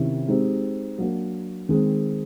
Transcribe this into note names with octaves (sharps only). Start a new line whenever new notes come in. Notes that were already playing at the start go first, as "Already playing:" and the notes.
Already playing: C3 D#3 C#4 E4
G#3 C4 D#4 G4
F#3 A#3 D4 F#4
D#3 G#3 C4